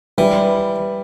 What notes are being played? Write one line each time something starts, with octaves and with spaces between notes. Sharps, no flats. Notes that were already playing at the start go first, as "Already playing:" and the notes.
E3 G3